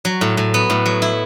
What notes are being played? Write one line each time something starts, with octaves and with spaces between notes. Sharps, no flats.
F#3
A2
A2
B3
A2
F#3
E4